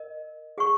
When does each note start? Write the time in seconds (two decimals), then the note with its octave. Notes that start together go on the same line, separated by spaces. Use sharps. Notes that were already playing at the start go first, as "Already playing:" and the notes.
Already playing: A#4 D#5
0.58 G#4 F#5 C#6